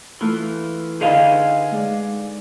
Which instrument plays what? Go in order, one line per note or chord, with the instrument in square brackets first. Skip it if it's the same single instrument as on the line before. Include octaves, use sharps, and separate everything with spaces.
[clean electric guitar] E3 [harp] A3 F4 B4
[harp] D3 D#4 [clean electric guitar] G#4 D#5 F5
[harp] G#3 D5